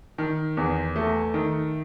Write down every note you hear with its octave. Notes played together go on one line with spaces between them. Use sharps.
D#3
E2
A3
D#3